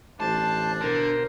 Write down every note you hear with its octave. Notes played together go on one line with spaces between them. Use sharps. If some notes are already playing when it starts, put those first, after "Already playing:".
A1 D4 C5 A5
B2 D3 A#4 C5